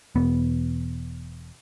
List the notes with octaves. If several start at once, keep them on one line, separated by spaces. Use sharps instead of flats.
E1 B3